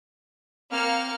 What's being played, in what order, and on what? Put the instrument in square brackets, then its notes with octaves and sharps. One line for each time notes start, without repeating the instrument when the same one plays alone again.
[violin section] A#3 F6 C#7 [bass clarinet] C4